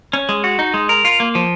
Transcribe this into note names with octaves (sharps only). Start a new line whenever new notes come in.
C#4
G#3
F#4
D#4
G#3
A#4
F4
A#3
F3